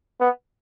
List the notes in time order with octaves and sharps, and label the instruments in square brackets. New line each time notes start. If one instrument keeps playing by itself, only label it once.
[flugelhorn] B3